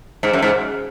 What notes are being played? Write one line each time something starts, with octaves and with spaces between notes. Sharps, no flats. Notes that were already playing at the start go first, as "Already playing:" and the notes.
G#2
F#2
G#2